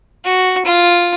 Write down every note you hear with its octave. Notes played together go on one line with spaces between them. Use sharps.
F#4
F4